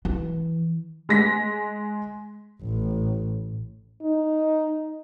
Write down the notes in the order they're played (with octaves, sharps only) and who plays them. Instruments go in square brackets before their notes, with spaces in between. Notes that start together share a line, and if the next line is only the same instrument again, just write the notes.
[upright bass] E3
[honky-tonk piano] G#3 A#6 B6
[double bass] A1
[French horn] D#4